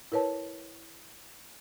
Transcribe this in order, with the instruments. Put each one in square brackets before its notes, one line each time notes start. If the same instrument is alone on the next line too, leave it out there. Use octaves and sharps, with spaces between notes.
[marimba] E4 A#4 B4 C#5 A5